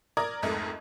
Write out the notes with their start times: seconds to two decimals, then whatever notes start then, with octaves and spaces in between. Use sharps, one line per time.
0.17 A#4 D5 A#5 D6 D#6 G#6
0.43 C2 F2 G#2 A3 D#4 A#4